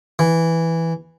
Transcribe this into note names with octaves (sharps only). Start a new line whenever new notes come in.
E3